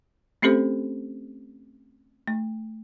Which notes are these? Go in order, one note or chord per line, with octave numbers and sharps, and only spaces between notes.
A3 C4 C#4 G4 A4 C5
A3